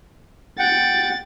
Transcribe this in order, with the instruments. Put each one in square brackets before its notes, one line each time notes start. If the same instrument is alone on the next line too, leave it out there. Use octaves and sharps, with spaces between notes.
[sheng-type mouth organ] F#5 G5 [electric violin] A6